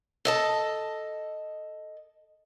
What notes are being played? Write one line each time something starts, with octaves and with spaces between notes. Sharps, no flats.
A4 D#5 A5